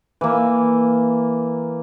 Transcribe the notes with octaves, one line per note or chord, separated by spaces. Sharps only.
E3 A#3